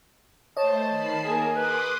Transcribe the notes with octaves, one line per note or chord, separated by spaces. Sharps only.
A3 C5 C#5 D#5 A5
D#3 B5 C7
A#3 G#4 A#4
B4 C6 D6 D#6